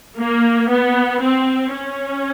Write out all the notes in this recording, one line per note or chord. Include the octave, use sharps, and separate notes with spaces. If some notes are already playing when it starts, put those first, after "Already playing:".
A#3
B3
C4
C#4